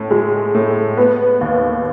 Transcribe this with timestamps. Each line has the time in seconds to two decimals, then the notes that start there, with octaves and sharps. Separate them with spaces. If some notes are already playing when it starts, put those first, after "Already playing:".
Already playing: A2 C#4
0.11 G#3
0.54 A2
0.97 B3
1.41 D#2